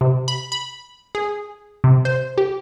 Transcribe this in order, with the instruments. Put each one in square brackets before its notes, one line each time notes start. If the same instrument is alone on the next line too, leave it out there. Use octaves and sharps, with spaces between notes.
[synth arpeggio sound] C3
B5
B5
G#4
C3
C5
G4